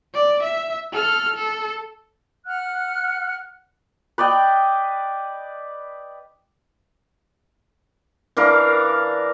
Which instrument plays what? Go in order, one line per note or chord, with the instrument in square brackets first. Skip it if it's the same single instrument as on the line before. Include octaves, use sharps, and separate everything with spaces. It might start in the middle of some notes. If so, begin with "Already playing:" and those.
[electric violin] D5
E5
A4 F6
A4
[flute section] F#5 F6 F#6
[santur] B4 D5 D#5 G5
[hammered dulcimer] E3 D4 A#4 F5